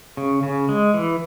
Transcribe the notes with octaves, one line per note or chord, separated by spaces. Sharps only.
C#3
C#3
G#3
E3